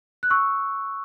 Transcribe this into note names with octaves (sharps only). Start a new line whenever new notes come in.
F#6
C#6 E6